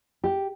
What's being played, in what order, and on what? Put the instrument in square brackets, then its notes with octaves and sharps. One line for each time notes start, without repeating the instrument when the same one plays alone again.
[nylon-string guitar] G4